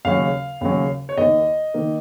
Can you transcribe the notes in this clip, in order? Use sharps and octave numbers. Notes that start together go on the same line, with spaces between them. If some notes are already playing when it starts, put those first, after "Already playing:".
D#2 C#3 F#3 C#4 F5
D#2 C#3 F#3 C#4
C#5
D#2 D#3 A#3 D#5
D#3 A#3